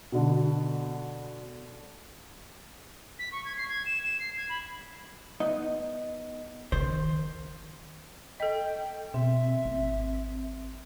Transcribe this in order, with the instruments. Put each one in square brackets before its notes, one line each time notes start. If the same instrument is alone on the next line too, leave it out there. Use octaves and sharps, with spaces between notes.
[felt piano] B2 D3
[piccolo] B6
C#6
G#6
C7
G#6
E7
E7
C7
G#6
B5
[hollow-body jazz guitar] B3 D#4 D#5
[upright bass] D#3 [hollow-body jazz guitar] C5
[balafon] A4 D#5 [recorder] G5
[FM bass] B2 [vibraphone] C4 [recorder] E5
[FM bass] G#1